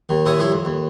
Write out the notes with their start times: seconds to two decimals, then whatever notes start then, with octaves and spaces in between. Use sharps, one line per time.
0.09 D#2 D#3
0.26 D#2 A#2 E4 C#5 E5 D#6
0.38 G2 F3 E4 C#5
0.52 F2
0.65 D#2